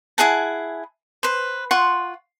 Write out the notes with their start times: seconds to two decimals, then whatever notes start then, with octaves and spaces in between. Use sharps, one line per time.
0.18 E4 G#4 F#5 A5
1.23 B4 C5
1.71 F4 F#5 C6 C#6